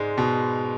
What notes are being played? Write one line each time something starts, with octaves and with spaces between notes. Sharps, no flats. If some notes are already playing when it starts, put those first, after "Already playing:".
Already playing: G#2 G#3 D5
B2